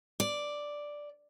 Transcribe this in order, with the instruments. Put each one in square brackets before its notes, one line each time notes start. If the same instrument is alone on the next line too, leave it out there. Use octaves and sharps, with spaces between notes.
[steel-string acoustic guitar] D5